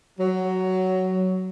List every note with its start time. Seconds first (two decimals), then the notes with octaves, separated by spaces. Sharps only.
0.20 F#3